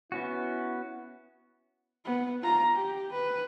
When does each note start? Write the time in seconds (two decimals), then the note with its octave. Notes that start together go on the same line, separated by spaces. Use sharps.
0.12 B3 C#4 E4 F#4
2.05 B3
2.42 F4 A#5
2.72 G4
3.12 B4